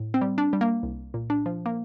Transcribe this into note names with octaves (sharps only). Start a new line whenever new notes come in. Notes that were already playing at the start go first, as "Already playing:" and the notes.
Already playing: A2
C4
G3
D4
G3
A#3
C2
A#2
D4
F3
A#3